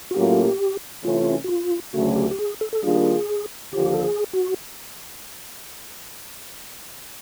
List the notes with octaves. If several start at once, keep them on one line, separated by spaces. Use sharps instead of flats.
F#4
A2 F#3 A#3 C#4 F4 G4
C3 E3 A3 C#4 F4
F#4
F4
D2 C#3 F#3 A3 F#4
G4
G4
G#4
A4
A4
D#3 G3 A#3 D4 F4 G#4
D#2 D3 F3 G4
A4
G#4
F#4